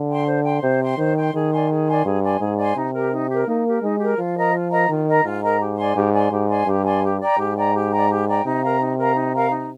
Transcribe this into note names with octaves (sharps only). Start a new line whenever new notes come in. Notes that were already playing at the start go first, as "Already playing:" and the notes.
Already playing: D3
G5 C6
C5
G5 C6
C3 C5
G5 C6
D#3 C5
G5 C6
D#3 G#4
D5 G#5 C6
G#4
D5 G#5 C6
G2 G#4
D5 G#5 C6
G#2 G#4
D5 G#5 C6
C3 D#4
G4 A#4
D#4
G4 A#4
A#3 D#4
G4 A#4
G#3 D#4
G4 A#4
F3 F4
A#4 D#5 A#5
F4
A#4 D#5 A#5
D#3 F4
A#4 D#5 A#5
G#2 F4
A#4 D#5 A#5
G4
D5 G#5 C6
G#2 G4
D5 G#5 C6
G#2 G4
D5 G#5 C6
G2 G4
D5 G#5 C6
G4
D5 G5 A#5
G#2 G4
D5 G5 A#5
G4
D5 G5 A#5
G4
D5 G5 A#5
C3 D#4
A#4 F5 A#5
D#4
A#4 F5 A#5
D#4
A#4 F5 A#5
D#4